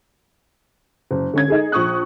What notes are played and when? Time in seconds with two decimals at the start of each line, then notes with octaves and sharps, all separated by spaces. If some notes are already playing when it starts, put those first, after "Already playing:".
1.11 F#1
1.33 D3 C#4 G#6
1.48 D#4 G#4 A4
1.72 A#1 C#6 D#6 F#6